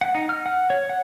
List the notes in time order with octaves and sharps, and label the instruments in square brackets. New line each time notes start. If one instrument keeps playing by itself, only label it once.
[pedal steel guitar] F#5
D#4
F6
F#5
C#5
F#5